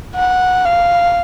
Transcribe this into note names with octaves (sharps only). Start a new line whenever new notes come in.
F#5
F5